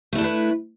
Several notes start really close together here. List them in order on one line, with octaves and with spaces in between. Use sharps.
A3 E4 D4 A4 B4